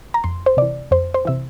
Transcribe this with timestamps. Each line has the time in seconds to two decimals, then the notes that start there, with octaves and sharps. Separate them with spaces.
0.14 A#5
0.24 F2 C6
0.46 C5
0.57 C3 E3 D5
0.91 F2 C5
1.14 C5
1.25 C3 E3 E5